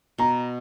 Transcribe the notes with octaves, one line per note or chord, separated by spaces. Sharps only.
B2 A#5